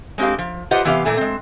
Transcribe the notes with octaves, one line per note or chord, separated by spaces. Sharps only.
G#3 C4 D#4 G4 F5
F3
F4 G4 B4 C5 D#5 F#5
C3 E3 B3 G4 A#4 F5
A#2 E3 A3 G#5
G#3 C4